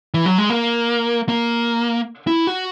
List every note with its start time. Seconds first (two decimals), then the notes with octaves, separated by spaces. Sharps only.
0.14 E3
0.26 F#3
0.38 G#3
0.50 A#3
1.29 A#3
2.27 E4
2.47 F#4